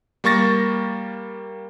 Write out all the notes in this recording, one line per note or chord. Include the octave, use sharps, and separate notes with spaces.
G3 A#3 C#6 A6 A#6